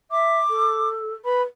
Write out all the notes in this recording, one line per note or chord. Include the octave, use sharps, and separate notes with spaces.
E5 D6
A4
B4 B5